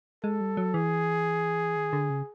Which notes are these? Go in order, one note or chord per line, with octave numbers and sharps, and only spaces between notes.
G#3 A4
G3
F#3
E3 G#4
D#3
D3
C#3